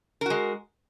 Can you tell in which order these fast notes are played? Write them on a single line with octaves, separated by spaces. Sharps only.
A#4 F#4 G#3